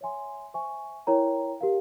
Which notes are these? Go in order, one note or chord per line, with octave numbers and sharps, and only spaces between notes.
C#5 E5 G#5 C6
C5 E5 G#5 C#6
E4 A#4 C#5 G5 A#5
G4 A#4 F5